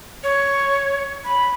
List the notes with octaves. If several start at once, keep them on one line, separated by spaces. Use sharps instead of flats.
C#5
B5